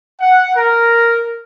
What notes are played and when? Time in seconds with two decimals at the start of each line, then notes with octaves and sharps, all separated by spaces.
0.20 F#5
0.56 A#4